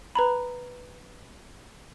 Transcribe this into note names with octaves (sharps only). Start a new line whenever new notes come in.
B4 A#5 B5